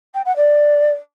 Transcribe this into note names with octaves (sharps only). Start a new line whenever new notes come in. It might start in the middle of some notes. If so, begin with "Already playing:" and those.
G5
F#5
D5